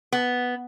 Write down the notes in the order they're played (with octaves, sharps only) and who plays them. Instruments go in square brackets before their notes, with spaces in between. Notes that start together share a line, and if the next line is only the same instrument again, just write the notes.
[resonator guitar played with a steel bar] B3